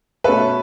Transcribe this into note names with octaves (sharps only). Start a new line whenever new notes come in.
B2 A3 C#4 A4 B4 E5